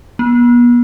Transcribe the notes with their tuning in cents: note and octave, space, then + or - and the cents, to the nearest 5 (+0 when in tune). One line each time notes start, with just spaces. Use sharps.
B3 -40